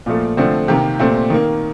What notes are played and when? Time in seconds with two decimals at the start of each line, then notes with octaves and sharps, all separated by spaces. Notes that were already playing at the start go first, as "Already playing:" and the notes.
0.06 A#2 F3 A3
0.37 D3 F3 A3 C4
0.68 C3 D#3 A#3 G4
0.99 A#2 A3 C4
1.30 D#3 A#3